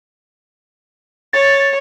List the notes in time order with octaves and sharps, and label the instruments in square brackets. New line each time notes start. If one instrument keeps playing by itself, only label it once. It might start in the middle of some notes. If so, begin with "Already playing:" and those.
[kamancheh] C#5 [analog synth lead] A6